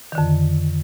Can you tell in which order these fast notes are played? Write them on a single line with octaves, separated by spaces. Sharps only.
D#3 D3 F2